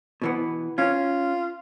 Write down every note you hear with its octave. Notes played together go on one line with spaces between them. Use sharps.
B2 E3 B3
C#4 F4